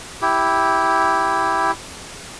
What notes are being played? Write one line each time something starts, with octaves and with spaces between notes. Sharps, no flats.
E4 G4